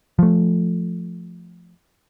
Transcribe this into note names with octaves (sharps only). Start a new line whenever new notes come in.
F3 A3